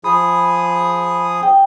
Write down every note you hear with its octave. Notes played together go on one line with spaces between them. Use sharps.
F3 G#4 B5 D#6
G5